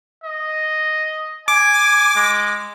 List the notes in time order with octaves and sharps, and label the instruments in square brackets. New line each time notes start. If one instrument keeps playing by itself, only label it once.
[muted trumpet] D#5
[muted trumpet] G#5 [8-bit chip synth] D6
[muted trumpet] G#3